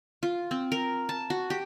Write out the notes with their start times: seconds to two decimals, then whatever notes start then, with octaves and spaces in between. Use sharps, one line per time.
0.23 F4
0.51 C4
0.72 A#4
1.09 A5
1.30 F#4
1.50 G4